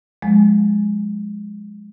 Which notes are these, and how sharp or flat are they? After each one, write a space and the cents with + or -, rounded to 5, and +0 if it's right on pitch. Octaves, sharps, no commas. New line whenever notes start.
F3 +40 G#3 +0